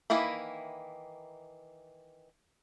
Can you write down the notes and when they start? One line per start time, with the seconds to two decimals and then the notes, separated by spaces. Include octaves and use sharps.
0.10 D#3 E3 A#3 E4 B5